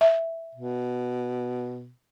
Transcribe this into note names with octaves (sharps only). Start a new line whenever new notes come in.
E5
B2